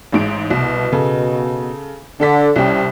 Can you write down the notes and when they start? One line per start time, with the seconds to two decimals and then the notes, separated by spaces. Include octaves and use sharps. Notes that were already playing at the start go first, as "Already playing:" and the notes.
0.12 A1 G#2 D7
0.50 C2 B2
0.92 C#3 A4
2.20 D3 D4 A4 B6
2.56 C2 C3 G3 C#4 G5